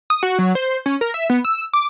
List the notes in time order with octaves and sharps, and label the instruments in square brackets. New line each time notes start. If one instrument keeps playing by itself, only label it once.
[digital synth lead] D#6
F#4
F#3
C5
C#4
A#4
E5
B3
E6
D6